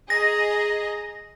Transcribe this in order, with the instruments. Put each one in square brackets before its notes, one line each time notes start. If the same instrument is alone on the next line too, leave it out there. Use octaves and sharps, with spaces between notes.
[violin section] G#4 D#5 A#5 [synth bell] A#6